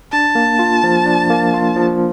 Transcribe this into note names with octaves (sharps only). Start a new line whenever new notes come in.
D4 A5
A#3
F4
F3
D4
A#3
F4
F3